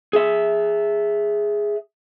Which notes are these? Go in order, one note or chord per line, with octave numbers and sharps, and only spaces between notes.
G#4 E5